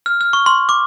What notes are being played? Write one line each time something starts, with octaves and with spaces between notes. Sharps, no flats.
F6
F6
C#6
C6
D6